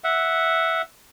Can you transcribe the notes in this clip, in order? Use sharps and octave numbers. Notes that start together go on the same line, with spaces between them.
E5 F#5